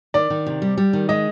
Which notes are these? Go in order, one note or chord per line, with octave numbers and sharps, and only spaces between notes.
D#3 D5
D#3
C3
G3
G3
D#3
G#3 D#5